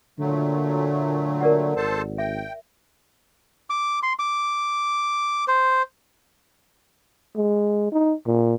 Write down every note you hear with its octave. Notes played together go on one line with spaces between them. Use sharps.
A#2 D3 F#3 A3
A#4 D5 F#5
G#1 A4 C5 A5
E5 G5
D6
C6
D6
C5
G#3
D#4
A#2